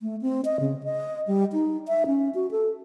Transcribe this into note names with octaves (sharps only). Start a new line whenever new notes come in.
A3
C4
D#5
C#3
D#5
G3
D#4
E5
C#4
F#4
A4